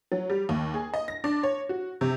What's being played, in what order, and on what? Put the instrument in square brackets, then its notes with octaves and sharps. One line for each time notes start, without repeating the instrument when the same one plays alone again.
[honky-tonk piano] F#3
G3
D#2
G#4
D#5
A#6
D4
C#5
F#4
C3